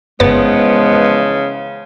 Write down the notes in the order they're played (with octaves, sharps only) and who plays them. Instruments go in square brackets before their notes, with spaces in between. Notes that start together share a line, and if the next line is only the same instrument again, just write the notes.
[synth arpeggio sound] G1 B4 A6 [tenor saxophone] C#3 [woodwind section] E3 F3 G#3 [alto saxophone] B3